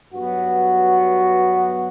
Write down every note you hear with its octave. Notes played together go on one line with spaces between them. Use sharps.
G2 F#3 B3 F#4